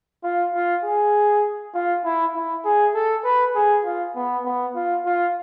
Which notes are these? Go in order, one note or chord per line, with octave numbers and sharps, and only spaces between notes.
F4
F4
G#4
F4
E4
E4
G#4
A4
B4
G#4
F4
B3
B3
F4
F4